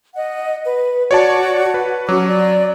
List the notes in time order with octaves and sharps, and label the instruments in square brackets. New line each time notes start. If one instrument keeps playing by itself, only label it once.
[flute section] D#5 F#5
B4
[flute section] F#4 [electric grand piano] C#5 D5 A5
[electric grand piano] B4
[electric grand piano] F#3 [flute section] C#4 F#4 D6
[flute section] D5